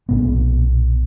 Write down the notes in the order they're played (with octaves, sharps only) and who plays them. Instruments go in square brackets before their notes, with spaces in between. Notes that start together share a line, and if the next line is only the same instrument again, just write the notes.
[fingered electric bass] B1 A#2 B3